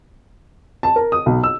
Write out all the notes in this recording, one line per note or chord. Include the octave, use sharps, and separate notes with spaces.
A5
A#4
D#6
B1
E6